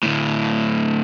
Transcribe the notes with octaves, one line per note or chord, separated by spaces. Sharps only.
D2 A2